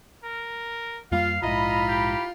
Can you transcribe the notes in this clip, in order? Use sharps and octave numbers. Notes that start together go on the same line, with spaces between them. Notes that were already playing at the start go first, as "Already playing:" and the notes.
A#4
F2 G3 A#3 F4 F5
A#1 G#2 E4 F4 D#5 A#5 B5
G4